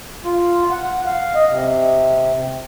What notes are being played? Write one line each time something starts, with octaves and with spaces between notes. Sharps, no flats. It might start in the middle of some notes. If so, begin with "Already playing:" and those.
F4
F#5
F5
D#5
C3